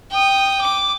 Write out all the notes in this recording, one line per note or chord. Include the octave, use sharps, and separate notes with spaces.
G5 D#6
D6